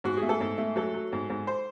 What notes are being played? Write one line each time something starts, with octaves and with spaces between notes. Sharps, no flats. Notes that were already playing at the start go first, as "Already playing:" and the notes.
G#2 F#4
G#4
A3
A4
G#2
A3
F#3 A4
F#3
G#2
G#2
C5